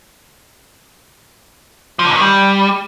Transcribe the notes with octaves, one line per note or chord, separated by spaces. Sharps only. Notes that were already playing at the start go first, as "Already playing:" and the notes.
F3
D3
G#2
D#3
G3